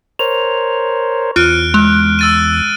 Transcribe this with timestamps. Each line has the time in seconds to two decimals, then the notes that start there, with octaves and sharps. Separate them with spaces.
0.19 A#4 C5 C#5 F7
1.36 E2 F4 F6 F#6 D7
1.74 G#3
2.19 E6 A6 D#7